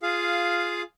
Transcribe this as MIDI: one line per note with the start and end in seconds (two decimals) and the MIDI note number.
0.03 0.82 65
0.03 0.82 68
0.03 0.82 77